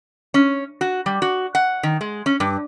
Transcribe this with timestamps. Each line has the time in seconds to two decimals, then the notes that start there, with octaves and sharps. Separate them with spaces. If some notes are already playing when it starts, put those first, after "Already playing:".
0.34 C#4
0.81 F#4
1.06 G3
1.22 F#4
1.55 F#5
1.83 D#3
2.01 G#3
2.26 C#4
2.40 G2